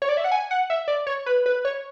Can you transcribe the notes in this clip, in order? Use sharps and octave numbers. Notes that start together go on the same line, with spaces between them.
C#5
D5
E5
F#5
G#5
F#5
E5
D5
C#5
B4
B4
C#5